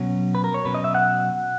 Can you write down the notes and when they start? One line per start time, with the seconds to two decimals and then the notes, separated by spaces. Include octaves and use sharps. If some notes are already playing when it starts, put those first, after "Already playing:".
Already playing: B2 F#3 C#4
0.35 B4
0.44 A#4
0.54 C#5
0.65 B2 F#3 C#4 B4
0.74 D#5
0.84 E5
0.95 F#5